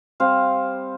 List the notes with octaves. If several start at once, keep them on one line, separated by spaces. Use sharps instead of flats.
G3 C4 F5